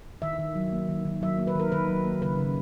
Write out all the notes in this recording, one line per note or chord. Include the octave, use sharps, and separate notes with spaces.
D#3 E5
D#3
F#3
A#3
D#3
D#3
F#3 E5
A#3
B4
D#3 A#4
D#3 B4
F#3
A#3
C#3 B4
C#3